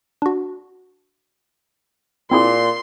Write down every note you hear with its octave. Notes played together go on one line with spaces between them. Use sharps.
D4 F#4
A#2 C4 E4 G#4 C6